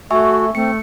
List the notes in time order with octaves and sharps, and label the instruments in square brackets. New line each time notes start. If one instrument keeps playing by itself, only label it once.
[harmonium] A3 [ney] F#4 [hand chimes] E5 G#5 C#6
[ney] A3 [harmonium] C4 [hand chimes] C#7